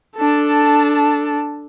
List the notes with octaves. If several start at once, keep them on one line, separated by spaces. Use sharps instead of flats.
D4 A4